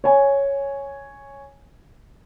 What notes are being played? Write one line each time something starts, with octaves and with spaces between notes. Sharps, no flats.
C#5 G#5